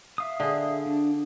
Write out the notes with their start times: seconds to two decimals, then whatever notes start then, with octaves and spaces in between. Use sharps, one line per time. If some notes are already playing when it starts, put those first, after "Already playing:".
0.18 E5 F5 D#6
0.40 D3 G#4
0.86 D4